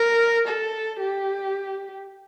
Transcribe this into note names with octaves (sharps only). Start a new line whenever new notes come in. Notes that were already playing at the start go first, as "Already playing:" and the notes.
Already playing: A#4
A4
G4